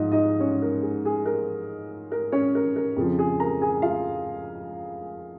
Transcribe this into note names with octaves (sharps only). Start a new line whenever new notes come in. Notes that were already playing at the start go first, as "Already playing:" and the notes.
Already playing: G#2 F3 D#4 F4 D#5
D#4 D#5
C#4 C#5
A#4
G#4
G#4
A#4
A#4
C#4 C#5
A#4
A#4
F2 C#3 F3
G#4 G#5
A#4 A#5
G#4 G#5
F4 F5